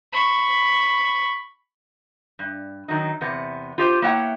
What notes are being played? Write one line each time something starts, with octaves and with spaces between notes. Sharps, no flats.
B5 C#6
G2
D#3 F#3 D#4
E2 C3 B3
F4 G4 C5
A#3 B3 E4 C#5 F#5 G5